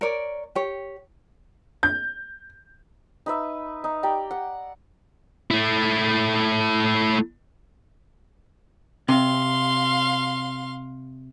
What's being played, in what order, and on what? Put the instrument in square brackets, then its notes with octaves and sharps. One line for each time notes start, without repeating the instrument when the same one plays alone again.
[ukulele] A#4 C#5 D5
G4 C#5
[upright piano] G6
[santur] D#4 B4 E5
D#4
G4 D5 G5 A#5
F#5
[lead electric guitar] A3 E4
[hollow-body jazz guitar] C3 [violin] F5 C6